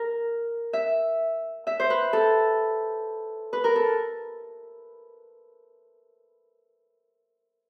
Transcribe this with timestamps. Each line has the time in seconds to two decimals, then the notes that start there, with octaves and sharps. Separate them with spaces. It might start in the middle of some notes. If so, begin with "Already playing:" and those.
Already playing: A#4
0.73 E5
1.67 E5
1.80 C5
1.90 B4
2.13 A4
3.53 B4
3.64 A#4
3.76 A4